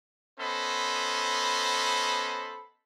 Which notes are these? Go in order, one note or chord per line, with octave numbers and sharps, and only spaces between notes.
B3 C#4 A4 C5 D#5 B5